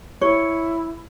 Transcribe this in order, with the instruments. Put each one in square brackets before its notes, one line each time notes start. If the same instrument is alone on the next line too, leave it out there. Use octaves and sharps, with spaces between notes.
[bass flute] E4 [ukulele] C#5